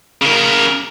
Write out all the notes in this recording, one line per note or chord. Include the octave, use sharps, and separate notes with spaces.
C#3 A#4